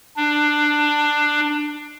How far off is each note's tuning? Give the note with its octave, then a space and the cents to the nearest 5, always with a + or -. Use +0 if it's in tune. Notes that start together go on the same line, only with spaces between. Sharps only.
D4 +15